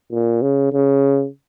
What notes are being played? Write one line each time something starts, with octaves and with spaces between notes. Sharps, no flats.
A#2
C#3
C#3